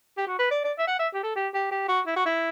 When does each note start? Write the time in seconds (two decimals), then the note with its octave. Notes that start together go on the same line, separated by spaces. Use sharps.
0.18 G4
0.27 F#4
0.39 B4
0.51 D5
0.64 D5
0.78 E5
0.87 F#5
0.99 E5
1.14 G4
1.23 A4
1.36 G4
1.54 G4
1.71 G4
1.88 F#4
2.07 E4
2.16 F#4
2.26 E4